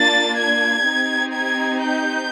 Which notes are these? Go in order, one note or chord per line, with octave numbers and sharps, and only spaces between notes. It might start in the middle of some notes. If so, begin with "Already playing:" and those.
Already playing: A#3 D4 F4 A6
G#6
C4 D#4 G4
G#6
G6